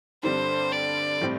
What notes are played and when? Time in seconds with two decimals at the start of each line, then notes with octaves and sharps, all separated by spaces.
0.23 G2 D3 G3 C4 C5
0.72 D5
1.21 A2 G3 C4